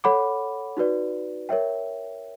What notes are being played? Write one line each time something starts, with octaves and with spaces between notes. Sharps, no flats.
A4 C#5 F#5 B5 D6
D#4 F#4 B4 D5
A#4 C#5 E5 G5